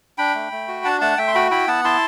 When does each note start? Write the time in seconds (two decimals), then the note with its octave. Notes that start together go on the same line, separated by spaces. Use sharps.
0.18 D4 G5 B5
0.35 A3
0.52 A3
0.68 F#4
0.84 D4 F#5 A5
1.01 A3 F#5 A5
1.17 A3 E5 G5
1.27 C6
1.34 F#4 G5 B5
1.51 E4 G5 B5
1.68 B3 F#5 A5
1.85 E4 A5 C6